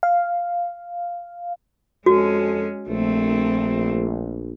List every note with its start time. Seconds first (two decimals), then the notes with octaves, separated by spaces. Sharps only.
0.03 F5
2.06 F2 G#3 C#4 F#4 A4
2.88 A#1 A3 C4